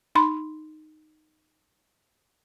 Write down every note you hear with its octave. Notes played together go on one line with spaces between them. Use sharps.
D#4 B5 C6